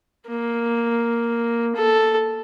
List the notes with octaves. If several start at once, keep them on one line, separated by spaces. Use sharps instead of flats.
A#3
A4